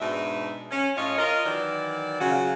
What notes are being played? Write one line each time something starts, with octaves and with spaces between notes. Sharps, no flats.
G#2 B2 D4 D#4 E5
C#4
A2 C#4 F4 C#5 D#5 F5
F4 A#4 D#5
D#3 E3 F#3 D5
C#3 F#3 C#4 F4 F#4